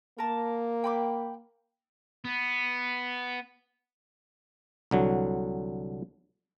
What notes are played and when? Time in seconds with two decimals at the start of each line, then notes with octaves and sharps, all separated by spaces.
0.18 A#3 A#4 A5
0.84 G5 B5 D6
2.25 B3
4.91 C2 D3 F#3